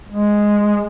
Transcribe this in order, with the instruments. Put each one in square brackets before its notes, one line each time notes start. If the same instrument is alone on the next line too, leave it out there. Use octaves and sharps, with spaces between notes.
[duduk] G#3